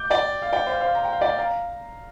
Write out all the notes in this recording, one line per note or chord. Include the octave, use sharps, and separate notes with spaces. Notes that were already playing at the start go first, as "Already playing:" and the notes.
Already playing: D6 G6
D5 G5
F5
D5 G5
C5 F5
C5 F5
A#5
G5
F5
D5 G5
F5 A#5